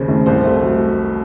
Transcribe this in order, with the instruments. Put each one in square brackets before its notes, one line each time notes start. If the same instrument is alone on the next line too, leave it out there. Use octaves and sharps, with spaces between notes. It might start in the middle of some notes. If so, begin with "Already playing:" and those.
Already playing: [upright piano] D#2 C#3 C#4 C5
F1
C2 C5
A3
F#3